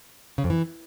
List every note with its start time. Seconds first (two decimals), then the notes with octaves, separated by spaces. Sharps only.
0.38 C#3
0.44 F2
0.50 E3